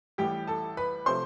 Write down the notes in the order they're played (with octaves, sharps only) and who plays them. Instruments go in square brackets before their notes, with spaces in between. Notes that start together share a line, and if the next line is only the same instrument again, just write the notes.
[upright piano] A1 A2 E3 G3 G4 G5
A4 A5
B4 B5
C3 F3 A3 C5 C6